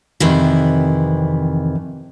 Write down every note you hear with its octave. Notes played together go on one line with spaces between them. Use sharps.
F2 C3 D#3 E3